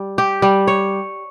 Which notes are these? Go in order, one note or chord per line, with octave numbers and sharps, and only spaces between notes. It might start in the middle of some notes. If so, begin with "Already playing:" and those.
Already playing: G3
G4
G3
C#5